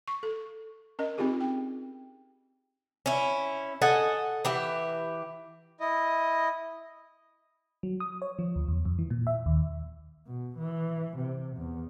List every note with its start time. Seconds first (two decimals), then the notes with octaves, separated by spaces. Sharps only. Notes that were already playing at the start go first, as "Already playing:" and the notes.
0.08 C#6
0.23 A4
0.99 C#4 A#4 D#5
1.18 C4 D#4 F4 G4 G#4
1.41 G5
3.06 C#4 E4
3.82 A4 D#5 F#5 G#5
4.45 E3 G4 E5
5.80 E4 D#5
7.83 F#3
8.00 D#6
8.22 C#5
8.39 F3
8.56 D2
8.68 E2
8.85 F2
8.99 E3
9.10 A#2
9.27 E5
9.46 D#2
10.27 B2
10.58 E3
11.17 C3
11.57 E2